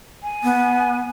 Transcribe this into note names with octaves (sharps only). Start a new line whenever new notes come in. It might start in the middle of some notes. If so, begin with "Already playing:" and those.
G#5
B3